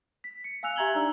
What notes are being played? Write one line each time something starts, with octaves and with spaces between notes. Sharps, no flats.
B6
C#7
F5 G#5 E6 F#6 F7
G4 E5 A#5 G#6 F#7 G7
D4 D#4 D5 E6